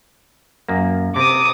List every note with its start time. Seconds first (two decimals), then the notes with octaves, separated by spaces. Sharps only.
0.69 F#2 A#3
1.16 C3 D6 D#6